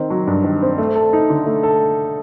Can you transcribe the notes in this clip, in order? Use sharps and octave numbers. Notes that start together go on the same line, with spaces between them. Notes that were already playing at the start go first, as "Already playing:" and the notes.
Already playing: D#3 C4
F#3
G2
D#3
C4
A3
A4
D#4
D3
A3
A4